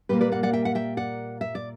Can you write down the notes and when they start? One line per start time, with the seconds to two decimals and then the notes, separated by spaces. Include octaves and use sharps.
0.09 A#2 G3 A#3 G4 B4
0.21 B4 D5
0.32 D5 F#5
0.43 D5 F#5
0.53 E5 G5
0.65 F#5
0.75 E5 G5
0.97 D5 F#5
1.41 E5
1.55 D5